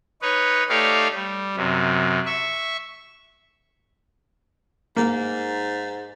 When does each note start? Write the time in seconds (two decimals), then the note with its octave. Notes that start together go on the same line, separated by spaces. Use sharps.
0.22 D#4 B4 C#5
0.69 A3 D#4 G4 C#5 D5 F5
1.15 G3
1.56 F#2 C3
2.26 E5 C#6
4.96 G#2 A#3